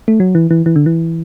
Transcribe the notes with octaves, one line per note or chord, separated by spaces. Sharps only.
A3
F#3
E3
E3
E3
D3
E3